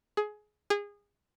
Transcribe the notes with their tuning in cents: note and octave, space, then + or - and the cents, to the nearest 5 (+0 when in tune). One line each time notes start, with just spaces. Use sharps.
G#4 +20
G#4 -25